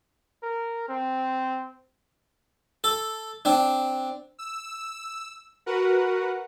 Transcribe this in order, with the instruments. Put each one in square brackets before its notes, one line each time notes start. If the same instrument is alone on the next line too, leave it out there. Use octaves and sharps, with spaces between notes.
[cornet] A#4
C4
[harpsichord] A4
C4 D4
[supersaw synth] E6
F#4 A#4 B4 F#5